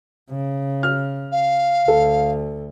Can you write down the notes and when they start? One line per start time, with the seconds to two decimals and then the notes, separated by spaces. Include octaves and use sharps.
0.31 C#3
0.83 F6
1.32 F5
1.88 D2 A4